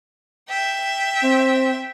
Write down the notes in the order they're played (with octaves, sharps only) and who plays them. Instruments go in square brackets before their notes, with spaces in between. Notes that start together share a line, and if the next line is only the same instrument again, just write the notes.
[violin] E5 G5
[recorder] C4